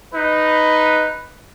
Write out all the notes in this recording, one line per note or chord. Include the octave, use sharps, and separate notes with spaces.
D#4 B4